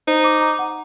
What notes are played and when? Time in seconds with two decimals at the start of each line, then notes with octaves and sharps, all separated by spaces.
0.07 D#4 C5
0.24 D6
0.41 A#5
0.59 F#5